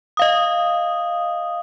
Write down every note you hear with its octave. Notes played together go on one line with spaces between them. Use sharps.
D#5 F5 D#6